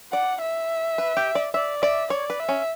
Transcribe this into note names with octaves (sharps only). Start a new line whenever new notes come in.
D5 F#5
E5
B4
G4
D5
D5 E5
D5 E5
C#5 D5
B4
E5
C#4